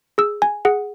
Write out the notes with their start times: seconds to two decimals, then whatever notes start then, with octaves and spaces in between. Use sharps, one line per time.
0.18 G#4 E6
0.42 G#5
0.65 G#4 F#5